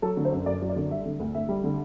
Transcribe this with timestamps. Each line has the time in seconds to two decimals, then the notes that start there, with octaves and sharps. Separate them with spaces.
0.02 F#3 A4
0.17 D3
0.25 C5
0.32 F#2
0.46 F#2 D5
0.62 F#3
0.69 D5
0.76 D3
0.91 G3 E5
1.05 D3
1.20 D2
1.35 D2 E5
1.49 G3
1.64 D3